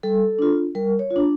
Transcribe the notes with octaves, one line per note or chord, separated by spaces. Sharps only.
G3 A4
D4 F4
G3 A#4
C#5
F4
D4